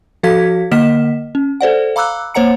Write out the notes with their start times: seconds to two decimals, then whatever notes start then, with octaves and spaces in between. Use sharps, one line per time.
0.23 F3 F#4 A4 F5 G#6 B6
0.71 D3 A#3 D#5 F6 B6 E7
1.35 C#4
1.61 A4 C5 D5 F#5
1.96 F5 A#5 B5 D6 E6 F#6
2.34 A#3 C5 C#5 F#5 A#5 C#7